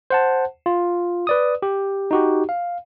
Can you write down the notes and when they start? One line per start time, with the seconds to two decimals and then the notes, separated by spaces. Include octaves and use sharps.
0.10 C5 F#5 A5
0.66 F4
1.27 B4 D5 D#6
1.62 G4
2.11 D#4 F#4 G4
2.49 F5